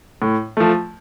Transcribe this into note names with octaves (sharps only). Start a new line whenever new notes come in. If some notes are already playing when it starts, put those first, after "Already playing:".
A2
F3 A3